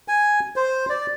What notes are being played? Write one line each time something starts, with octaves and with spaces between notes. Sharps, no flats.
G#5
C5
D5